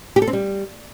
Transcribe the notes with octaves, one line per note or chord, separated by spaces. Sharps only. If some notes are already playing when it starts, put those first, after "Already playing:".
G4
A4
C4
G3